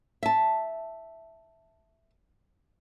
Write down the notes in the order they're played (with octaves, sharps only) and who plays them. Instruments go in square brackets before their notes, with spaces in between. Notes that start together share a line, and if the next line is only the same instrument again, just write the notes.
[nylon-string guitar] E5 A5